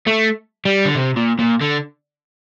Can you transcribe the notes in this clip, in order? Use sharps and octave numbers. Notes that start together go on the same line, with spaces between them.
A3
G3
D3
C3
A#2
A#2
D3